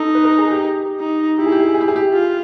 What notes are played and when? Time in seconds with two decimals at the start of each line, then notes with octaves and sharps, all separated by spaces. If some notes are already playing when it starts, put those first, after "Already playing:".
Already playing: D#4 A4
0.15 B4
0.25 A#4
0.38 G#4
0.51 G4
0.63 G4
1.00 D#4
1.38 E4 G4
1.46 G#4
1.52 G4
1.59 G#4
1.67 G4
1.74 G#4
1.81 G4
1.88 G#4
1.96 G4
2.13 F4